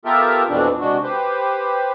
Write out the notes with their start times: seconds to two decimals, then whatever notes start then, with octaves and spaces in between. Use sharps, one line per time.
0.05 B3 F4 G4 A4 A#4 E5
0.50 F2 B2 E3 C4 D4
0.80 C3 G#3 D4 F#4
1.03 G4 B4 C5